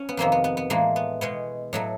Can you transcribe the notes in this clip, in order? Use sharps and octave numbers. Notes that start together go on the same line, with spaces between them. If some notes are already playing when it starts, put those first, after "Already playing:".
Already playing: C#4
B3
F2 C3 D#3 A#3 C4
B3
B3
B3
A2 E3 G#3 A#3
B3
B2 G#3 B3
A2 F#3 A3